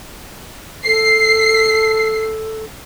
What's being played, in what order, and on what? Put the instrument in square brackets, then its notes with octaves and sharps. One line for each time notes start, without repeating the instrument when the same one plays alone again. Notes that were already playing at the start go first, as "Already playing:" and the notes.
[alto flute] A4 [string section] C7